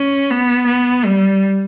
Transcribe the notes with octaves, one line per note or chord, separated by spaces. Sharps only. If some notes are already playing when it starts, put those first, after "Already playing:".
Already playing: C#4
B3
B3
G3